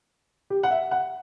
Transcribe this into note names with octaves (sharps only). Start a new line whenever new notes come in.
G4
F#5
E5
F#5